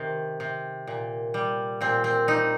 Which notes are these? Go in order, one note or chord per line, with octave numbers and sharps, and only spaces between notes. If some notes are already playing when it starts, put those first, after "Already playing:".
Already playing: C3 D#3
C3
A#2
G3
A#2 C4
C4
G3 D#4